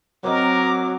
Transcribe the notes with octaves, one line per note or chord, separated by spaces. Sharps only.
F#3 C4 A#4 D#5 D6